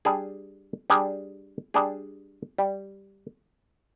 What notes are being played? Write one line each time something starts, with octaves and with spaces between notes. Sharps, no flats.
G3 D4 G#4
G3 D4 G#4
G3 D4 G#4
G3